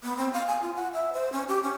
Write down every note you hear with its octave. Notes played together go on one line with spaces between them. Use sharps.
B3
C4
F5
G#5
F4
F#5
E5
C5
C#4
G4
C#4